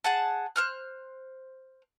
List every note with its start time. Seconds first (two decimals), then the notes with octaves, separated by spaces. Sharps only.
0.04 G#4 F#5 A5
0.56 C5 F6 F#6